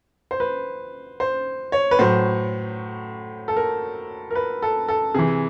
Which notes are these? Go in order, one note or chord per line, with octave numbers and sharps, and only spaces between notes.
C5
B4
C5
C#5
B4
A2 F#3 C5
A4
A#4
A#4
B4
A4
A4
C3 E3 G#4